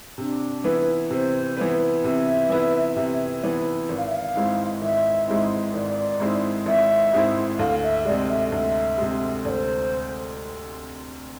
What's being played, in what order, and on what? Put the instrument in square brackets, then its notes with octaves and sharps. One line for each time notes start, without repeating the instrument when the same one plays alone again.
[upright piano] C3 [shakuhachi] D4
[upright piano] E3 B3 E4 B4
[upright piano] C3 [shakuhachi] C5
[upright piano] E3 B3 E4 B4
[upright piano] C3 [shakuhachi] E5
[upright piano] E3 B3 E4 B4
C3
E3 B3 E4 B4
G#1
[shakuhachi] F5
E5
F5
[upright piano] G#2 G#3 C4 E4
[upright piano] G#1 [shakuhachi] E5
[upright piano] G#2 G#3 C4 E4
[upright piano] G#1 [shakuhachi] D5
[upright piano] G#2 G#3 C4 E4
[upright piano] G#1 [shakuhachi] E5
[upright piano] G#2 G#3 C4 E4
[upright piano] D2 [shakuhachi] F5
[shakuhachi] E5
[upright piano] C3 G#3 [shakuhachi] D5
[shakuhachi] E5
[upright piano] D2 [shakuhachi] E5
[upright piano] C3 G#3
[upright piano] D2 [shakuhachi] D5
[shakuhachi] C5